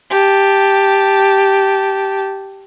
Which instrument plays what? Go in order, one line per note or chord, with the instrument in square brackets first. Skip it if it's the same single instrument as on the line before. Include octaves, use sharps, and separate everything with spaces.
[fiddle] G4 A5